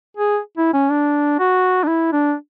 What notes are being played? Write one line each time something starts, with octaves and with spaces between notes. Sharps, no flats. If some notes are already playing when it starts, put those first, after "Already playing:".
G#4
E4
C#4
D4
F#4
D4
E4
D4